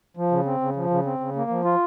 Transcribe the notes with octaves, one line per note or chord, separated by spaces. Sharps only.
F3
C#3
C4
C#3
F3
C#3
C4
C#3
A#3
F3
F4